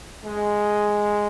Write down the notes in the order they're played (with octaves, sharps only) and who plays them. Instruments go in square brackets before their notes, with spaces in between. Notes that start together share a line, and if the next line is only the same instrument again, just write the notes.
[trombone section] G#3